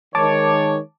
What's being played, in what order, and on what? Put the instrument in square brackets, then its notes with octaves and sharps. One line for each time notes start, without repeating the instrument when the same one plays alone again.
[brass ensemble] D#3 G#3 C#5 [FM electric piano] A5 D6